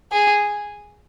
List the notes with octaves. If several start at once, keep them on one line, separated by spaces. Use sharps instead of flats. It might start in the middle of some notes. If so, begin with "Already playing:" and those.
G#4